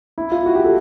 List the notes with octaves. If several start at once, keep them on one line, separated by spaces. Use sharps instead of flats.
E4
F4
F#4
G4
A4